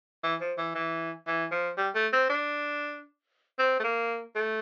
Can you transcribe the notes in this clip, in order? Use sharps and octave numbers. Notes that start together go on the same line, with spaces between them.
E3
F3
E3
E3
E3
F3
G3
A3
C4
D4
C4
A3
A#3
A3